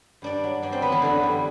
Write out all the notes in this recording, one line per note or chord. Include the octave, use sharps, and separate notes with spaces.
G2 D4 D5
F#3
G2 D4 D5
C4 C5
F#3 B3 B4
E3 E4
F#2 D3 D4
D3 G3